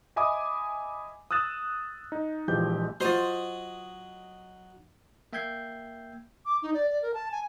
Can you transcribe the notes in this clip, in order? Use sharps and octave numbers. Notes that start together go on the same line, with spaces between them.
D#5 E5 G#5 B5 D6 D#6
D#6 E6 F#6 A6 E7
D#4
A#1 E3 F3 G#3 G4 G6
F#3 F4 C5 D#5
A#3 E5 G5 G6 G#6 C7
D6
D#4
D5
D5
A#4
A5
G#5